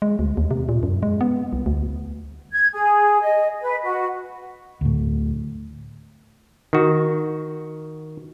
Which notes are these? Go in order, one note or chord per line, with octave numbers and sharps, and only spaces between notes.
G#3
D2
D#2
C3
A#2
F#2
G#3
B3
C2
D2
G#6
G#4
D#5
B4
F#4
D2 A2
D#3 F#4